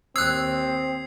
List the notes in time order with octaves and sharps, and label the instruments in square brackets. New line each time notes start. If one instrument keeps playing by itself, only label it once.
[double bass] D#2 [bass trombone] C4 [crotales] D#6 G#6 C7 [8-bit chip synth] E6 F#6